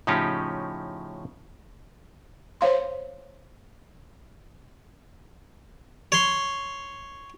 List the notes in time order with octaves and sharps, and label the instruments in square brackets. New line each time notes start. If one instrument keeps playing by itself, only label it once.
[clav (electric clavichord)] A2 C#3 F3 C#4 D#4 G4
[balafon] C5 C#5 F5 C6
[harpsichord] C#5 C6